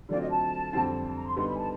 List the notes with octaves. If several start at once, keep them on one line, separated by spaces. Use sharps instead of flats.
D3 F#3 A3 C4 F4 D5
D#5
A5
F2 D3 G3 C4
A5
A#5
C6
D3 G3 B3 D#4 C6
B5
G#5
A5